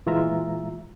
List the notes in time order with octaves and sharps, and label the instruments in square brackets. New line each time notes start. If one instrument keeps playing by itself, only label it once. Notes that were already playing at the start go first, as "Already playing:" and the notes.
[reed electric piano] A#2 E3 G#3 F4 E5 A#5